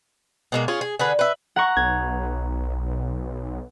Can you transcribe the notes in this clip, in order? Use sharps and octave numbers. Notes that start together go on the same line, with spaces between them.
B2 G#3 A#3
C#4 F4 G#4
G#4
D3 G#4 B4
B4 E5
F#5 A#5 C#6
B1 G#6